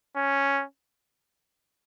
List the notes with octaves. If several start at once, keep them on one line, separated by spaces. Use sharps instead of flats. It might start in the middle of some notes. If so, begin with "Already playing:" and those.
C#4